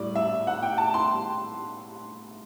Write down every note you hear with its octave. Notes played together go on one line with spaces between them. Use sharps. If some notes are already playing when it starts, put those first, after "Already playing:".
Already playing: A2 G3 D5
E5
F#5
G5
A5
C6